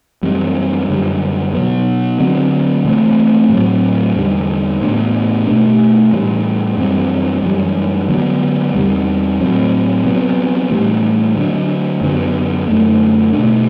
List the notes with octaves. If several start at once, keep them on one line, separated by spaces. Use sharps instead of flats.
F#2 E3 G3 C4
F#2 D3 G3
B2 F#3 B3
D3 F#3 C4
C3 E3 A3 C4
A2 F#3 C4
E2 D3 G3
A2 E3 B3 D4
B2 A3 D4
A2 E3 G3
F#2 E3 G3 C4
F#2 E3 G3
D3 F#3 B3
E2 C3 G3
A2 F#3 C4
C3 F#3 B3
A2 E3 G3
D3 F#3 A3 D4
F#2 D3 F#3 B3
F#2 D3 A3
B2 A3 D4